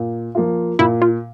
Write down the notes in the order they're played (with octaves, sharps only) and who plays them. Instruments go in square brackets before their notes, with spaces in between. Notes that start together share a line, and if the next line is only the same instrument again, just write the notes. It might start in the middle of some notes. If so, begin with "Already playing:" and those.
Already playing: [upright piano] A#2
F3 A#3 F4
[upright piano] A#2 [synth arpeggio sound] E4
[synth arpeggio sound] F4